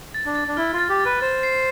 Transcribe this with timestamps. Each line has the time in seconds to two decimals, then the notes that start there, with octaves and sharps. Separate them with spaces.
0.14 A6
0.25 D4
0.35 A6
0.48 D4
0.57 E4 F6
0.73 F4
0.78 A6
0.89 G4
1.00 A6
1.05 B4
1.21 C5 A6
1.43 C7